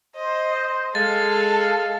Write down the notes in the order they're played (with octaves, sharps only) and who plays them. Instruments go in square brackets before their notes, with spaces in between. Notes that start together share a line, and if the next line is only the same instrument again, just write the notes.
[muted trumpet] C5 [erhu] D#5
[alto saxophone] G#3 [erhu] A4 [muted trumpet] F5 [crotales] A6